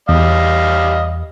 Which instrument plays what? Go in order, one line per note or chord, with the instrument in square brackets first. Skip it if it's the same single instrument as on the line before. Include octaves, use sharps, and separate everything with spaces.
[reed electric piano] E2 [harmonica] G3 D#5 F5